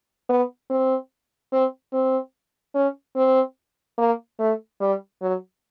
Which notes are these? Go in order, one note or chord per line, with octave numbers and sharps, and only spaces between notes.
B3
C4
C4
C4
C#4
C4
A#3
A3
G3
F#3